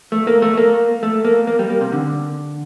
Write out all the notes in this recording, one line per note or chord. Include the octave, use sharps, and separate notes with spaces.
A3
A#3
A3
A#3
A3
A#3
A#3
G3
A#3
C3
D3